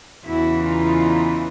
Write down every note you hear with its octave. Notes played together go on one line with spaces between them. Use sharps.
E2 C#3 E3 E4 F#4
D#4 F4